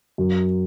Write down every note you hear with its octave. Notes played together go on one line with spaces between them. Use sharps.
F#2